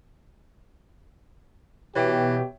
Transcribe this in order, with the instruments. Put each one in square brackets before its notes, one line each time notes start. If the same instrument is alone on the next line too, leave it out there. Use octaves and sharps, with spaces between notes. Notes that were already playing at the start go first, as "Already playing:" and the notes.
[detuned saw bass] B2 [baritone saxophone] E3 [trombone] G4 [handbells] C#5 E5 G5